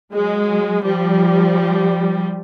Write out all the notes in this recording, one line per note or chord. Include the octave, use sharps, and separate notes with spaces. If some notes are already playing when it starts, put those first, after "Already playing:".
F#3 G#3
F3 G3